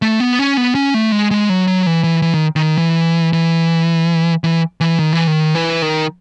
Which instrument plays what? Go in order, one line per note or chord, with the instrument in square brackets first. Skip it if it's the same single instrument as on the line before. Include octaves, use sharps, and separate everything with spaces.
[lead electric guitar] A3
B3
C#4
B3
C#4
A3
G#3
G#3
F#3
F#3
E3
E3
E3
D#3
D#3
E3
E3
E3
E3
D#3
E3
D#3
E3
D#3